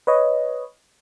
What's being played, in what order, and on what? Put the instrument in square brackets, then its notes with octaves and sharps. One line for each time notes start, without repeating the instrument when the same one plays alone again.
[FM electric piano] B4 C#5 D#5